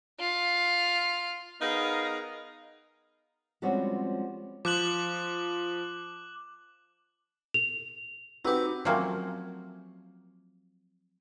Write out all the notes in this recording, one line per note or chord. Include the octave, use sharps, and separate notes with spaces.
F4
B3 D#4 G#4 A#4 F5
F3 G3 G#3 C4 C#4 F#4
F3 D6 F#6 F#7
F7
C4 D#4 F#4 G4 B4
F3 F#3 A3 A#3 C4 C#4